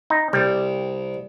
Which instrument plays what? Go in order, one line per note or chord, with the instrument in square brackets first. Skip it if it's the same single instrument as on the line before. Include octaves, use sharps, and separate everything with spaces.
[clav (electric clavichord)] D#4
[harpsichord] C2 [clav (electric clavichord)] G3